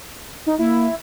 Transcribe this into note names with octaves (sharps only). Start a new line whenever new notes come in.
D#4
A#3 E4